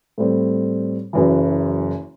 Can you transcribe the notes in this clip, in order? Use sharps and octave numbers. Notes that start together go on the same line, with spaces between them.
A2 G3 C4
F#1 F#2 E3